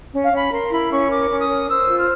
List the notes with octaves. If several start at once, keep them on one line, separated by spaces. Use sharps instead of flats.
C#4
F5
C#4 B5
A#4 C6
E4 B5
C#4 C#6
A#4 D6
C#4
D#6
A#4
C5 E6
F4
F6